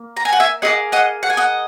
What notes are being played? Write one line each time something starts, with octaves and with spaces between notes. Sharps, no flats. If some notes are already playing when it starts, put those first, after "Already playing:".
Already playing: A#3
A#5
G#5
F#5
E5 G#5
A#3 E4 G#4 D#5 F#5
D#5 F#5
F#5
G#5
D#5 F#5